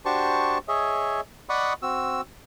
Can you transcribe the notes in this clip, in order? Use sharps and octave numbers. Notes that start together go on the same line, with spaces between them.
D4 F#4 G4 C5 A5 C#6
G#4 C#5 D#5 E5
D5 D#5 F#5 B5 C#6 D#6
C4 F#4 E6